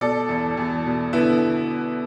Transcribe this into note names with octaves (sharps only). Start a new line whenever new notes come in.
B2 A4 D5
E2
E2
B2
D3 B3 E4